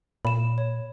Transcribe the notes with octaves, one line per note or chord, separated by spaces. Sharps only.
A#2 B5 E7
C#5